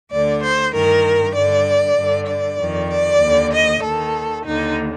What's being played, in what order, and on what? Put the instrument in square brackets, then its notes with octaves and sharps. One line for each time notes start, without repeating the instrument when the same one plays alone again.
[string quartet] D2 D3 D5
C5
G2 D#3 A#4
G2 D3 D5
G2 D3
D5
F2 D#3
D5
D#2 D3
D#5
D#2 D#3 A4
D#2 D3 D#4